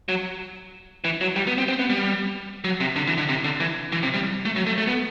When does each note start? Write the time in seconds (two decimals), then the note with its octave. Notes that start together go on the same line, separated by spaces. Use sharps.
0.09 F#3
1.04 E3
1.21 F#3
1.36 G3
1.47 B3
1.58 C4
1.68 C4
1.79 B3
1.90 G3
2.64 F#3
2.80 C3
2.96 D3
3.07 E3
3.18 D3
3.29 C3
3.44 D3
3.60 E3
3.92 E3
4.03 C3
4.14 G3
4.45 A3
4.56 F#3
4.67 A3
4.78 A3
4.87 B3